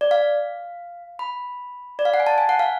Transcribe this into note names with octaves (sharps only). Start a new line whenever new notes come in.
D5
F5
B5
D5
F5
F#5
G#5
A5
G#5
F#5
F5